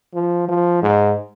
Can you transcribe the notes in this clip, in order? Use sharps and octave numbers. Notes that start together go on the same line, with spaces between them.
F3
F3
G#2